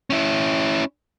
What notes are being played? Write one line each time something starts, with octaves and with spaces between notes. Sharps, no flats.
C#4 E4